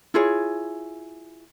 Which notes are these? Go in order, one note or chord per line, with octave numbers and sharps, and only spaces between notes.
E4 F4 G#4 C#5